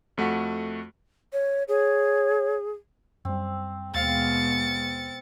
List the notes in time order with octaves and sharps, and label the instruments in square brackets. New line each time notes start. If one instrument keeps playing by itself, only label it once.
[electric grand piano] F2 A3 F#4 F#5 B6
[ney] C#5
[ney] G#4 [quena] C#5
[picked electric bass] F#2 G3 [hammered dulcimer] C4
[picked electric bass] D#2 [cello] B2 G#3 [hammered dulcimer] C4 F5 [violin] A6 C#7